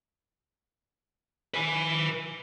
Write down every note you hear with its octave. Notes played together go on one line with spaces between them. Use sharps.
B4 G#5